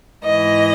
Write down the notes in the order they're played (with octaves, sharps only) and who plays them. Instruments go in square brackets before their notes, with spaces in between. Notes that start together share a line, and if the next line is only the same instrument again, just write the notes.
[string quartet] G#2 E3 D#5